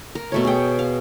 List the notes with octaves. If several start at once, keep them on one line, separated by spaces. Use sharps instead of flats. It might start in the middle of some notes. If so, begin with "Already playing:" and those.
A#4
B2 A3 C#5
G#4 G5
F5